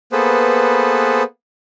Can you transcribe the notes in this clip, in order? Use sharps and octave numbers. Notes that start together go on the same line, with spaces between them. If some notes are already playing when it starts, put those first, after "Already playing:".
A#3 B3 G#4 A4 B4 C5